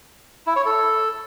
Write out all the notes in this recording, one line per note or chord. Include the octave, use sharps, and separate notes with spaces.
E4
C#5
A4